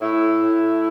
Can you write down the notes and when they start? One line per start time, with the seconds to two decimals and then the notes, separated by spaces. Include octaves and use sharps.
0.01 A2 E4
0.40 A2